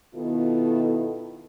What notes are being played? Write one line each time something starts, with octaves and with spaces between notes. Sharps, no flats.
B2 D#3 B3 E4 F4 A4